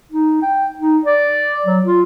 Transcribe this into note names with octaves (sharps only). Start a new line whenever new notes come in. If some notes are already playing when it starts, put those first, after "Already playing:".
D#4
G5
D#4
D5
F#3
F4